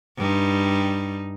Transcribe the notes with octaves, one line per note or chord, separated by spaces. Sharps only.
G2 G3 D#4